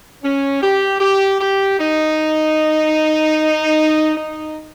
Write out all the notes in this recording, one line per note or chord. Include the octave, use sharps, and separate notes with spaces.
C#4
G4
G4
G4
D#4
D#4